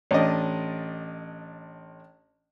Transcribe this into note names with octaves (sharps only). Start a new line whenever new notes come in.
A1 D4 D#5